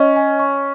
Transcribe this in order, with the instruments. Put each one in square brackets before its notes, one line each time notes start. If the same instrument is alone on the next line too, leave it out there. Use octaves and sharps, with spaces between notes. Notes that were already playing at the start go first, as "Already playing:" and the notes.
Already playing: [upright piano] C#4 [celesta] D#5 C#6
[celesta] G#5
C#6